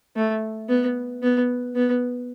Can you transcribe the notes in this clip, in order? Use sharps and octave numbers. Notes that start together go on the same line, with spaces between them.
A3
B3
B3
B3